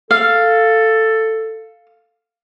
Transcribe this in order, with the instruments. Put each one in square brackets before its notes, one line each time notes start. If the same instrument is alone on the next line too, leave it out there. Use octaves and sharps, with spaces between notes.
[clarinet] A4 [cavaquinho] F5